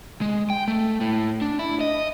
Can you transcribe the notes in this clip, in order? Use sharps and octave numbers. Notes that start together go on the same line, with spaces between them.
G#3
G5
A3
A2
D4
E4
D#5